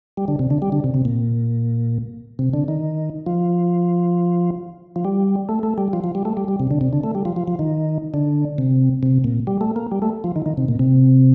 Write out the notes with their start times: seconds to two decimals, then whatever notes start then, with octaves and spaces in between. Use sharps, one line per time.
0.17 G3
0.28 D3
0.39 C3
0.50 D3
0.62 G3
0.72 D3
0.84 C3
0.94 C3
1.05 A#2
2.39 C3
2.53 D3
2.68 D#3
3.26 F3
4.96 F3
5.05 G3
5.49 A3
5.63 A3
5.78 G3
5.93 F3
6.04 F3
6.15 G3
6.25 A3
6.37 G3
6.48 G3
6.60 C3
6.71 D3
6.81 C3
6.93 D3
7.04 A3
7.15 G3
7.25 F3
7.36 F3
7.48 F3
7.59 D#3
8.14 D3
8.58 C3
9.03 C3
9.24 A#2
9.47 G3
9.61 A3
9.76 A#3
9.92 G3
10.02 A3
10.24 F3
10.36 D#3
10.46 D#3
10.57 C3
10.68 A#2
10.79 C3